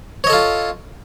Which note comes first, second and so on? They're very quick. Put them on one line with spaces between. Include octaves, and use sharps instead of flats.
C#5 D#5 A4 F4